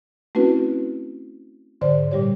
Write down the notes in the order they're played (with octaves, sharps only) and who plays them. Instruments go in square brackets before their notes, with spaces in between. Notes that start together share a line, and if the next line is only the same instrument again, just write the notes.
[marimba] A3 C4 C#4 E4 F#4 B4
G#2 D3 C5 D5
A#2 G3 G4 C#5